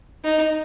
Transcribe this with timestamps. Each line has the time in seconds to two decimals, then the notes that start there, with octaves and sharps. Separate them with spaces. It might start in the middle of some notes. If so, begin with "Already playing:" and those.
0.24 D#4